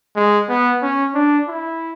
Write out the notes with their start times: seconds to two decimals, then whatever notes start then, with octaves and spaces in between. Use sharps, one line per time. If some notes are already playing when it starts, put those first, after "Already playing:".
0.16 G#3
0.49 B3
0.82 C#4
1.15 D4
1.48 E4